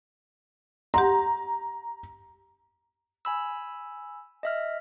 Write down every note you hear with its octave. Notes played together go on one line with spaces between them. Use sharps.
G4 F#5 A#5 C6
G#5 B5 E6
D#5 E5 F6